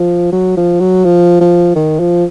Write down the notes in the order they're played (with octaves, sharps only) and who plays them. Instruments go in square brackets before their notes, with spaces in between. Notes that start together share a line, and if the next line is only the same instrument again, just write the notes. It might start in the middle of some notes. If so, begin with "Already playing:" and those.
Already playing: [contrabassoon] F3
F#3
F3
F#3
F3
F3
D#3
F3